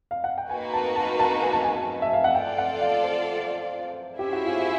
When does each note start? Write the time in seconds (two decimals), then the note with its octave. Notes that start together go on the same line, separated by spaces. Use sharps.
0.11 F5
0.24 F#5
0.38 G5
0.50 A#3 D#4 F#4 B4 G#5
0.74 A5
0.96 A5
1.19 A5
1.42 G#5
1.53 A5
1.64 G#5
2.02 E5
2.13 F5
2.24 F#5
2.35 F4 A4 D5 G5
2.58 F#5
2.81 F5
3.04 C5
4.19 C#4 E4 G4 G#4 C5 E5
4.33 F#4
4.46 F4
4.59 F#4